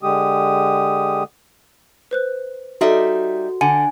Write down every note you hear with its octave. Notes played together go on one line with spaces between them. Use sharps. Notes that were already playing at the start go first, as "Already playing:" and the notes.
D3 G#3 G4 D#6
B4 C5 F#6
G3 D#4 F#4 A4 D5 E5
D3 F#5 G#5 D#7